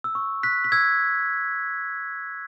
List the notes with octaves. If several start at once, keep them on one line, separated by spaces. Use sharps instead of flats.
E6
C#6
F#6 B6
B6
E6 G#6